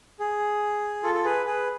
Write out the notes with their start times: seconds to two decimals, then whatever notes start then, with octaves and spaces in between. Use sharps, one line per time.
0.19 G#4
1.03 F4 A4
1.14 A4
1.24 G#4 B4
1.46 G#4 B4